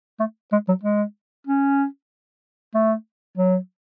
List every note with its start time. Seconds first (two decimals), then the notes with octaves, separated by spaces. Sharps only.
0.20 A3
0.52 G#3
0.68 F#3
0.83 G#3
1.47 C#4
2.74 A3
3.38 F#3